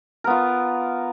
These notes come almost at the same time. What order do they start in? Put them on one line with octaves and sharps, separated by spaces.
A#4 B3 F4